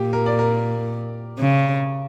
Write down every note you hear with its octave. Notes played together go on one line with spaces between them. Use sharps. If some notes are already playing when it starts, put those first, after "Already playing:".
Already playing: A#2 G4
A#4
D5
A#4
C#3